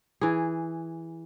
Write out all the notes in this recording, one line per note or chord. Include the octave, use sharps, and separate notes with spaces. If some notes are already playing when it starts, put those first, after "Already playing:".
E3 G#4